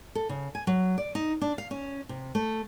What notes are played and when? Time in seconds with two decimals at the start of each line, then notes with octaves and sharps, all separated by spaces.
0.15 A4
0.29 C#3
0.55 G#5
0.67 F#3
0.98 D5
1.15 D#4
1.41 D4
1.58 F5
1.71 C#4
2.09 C3
2.35 A3